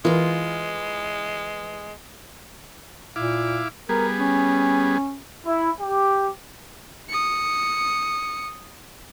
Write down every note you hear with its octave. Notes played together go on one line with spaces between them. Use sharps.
E3 G#3 F4 A#4
A#2 E4 F5 D6
G3 B3 G#4 A#4
C#4
E4
G4
D#6 C#7